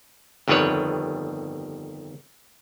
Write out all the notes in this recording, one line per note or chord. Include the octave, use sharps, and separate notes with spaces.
G1 F2 D#3 G3 B4 C#5